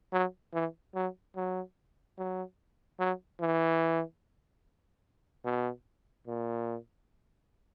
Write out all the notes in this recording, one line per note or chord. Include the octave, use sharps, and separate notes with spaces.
F#3
E3
F#3
F#3
F#3
F#3
E3
B2
A#2